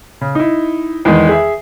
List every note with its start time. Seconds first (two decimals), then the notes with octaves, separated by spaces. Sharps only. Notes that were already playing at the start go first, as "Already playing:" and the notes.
0.21 C#3
0.35 D#4 E4
1.05 E2 D#3 G#3
1.29 G#4 E5